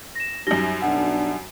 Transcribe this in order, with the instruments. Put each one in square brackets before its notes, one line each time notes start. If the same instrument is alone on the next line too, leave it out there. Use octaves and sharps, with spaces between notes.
[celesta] A#6 E7
[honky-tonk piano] F#2 G3 [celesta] D#4 A#6 G7
[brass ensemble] B1 D4 [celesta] F#5